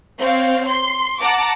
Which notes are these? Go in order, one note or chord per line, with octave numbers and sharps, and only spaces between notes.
C4 C#5 F5
C6
F#5 A5 A#5 D6